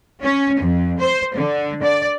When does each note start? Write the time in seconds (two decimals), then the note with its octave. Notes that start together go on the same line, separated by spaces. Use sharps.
0.23 C#4
0.61 F2
1.00 C5
1.36 D3
1.83 D5